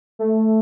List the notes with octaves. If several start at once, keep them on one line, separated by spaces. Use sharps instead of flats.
A3